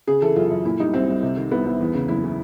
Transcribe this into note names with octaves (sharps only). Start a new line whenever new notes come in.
C#3 G#4
E3 A4
F#2 F4
F#2
A#2 E4
G3 D#4
C2 C4
C2
C3
D#3
C2 B3
C2
E2
C#3
F#1 E4
E3